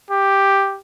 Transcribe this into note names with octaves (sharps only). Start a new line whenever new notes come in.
G4